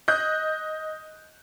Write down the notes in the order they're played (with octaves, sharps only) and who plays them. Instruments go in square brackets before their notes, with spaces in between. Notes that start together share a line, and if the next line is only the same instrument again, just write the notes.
[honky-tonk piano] D#5 F#6 G6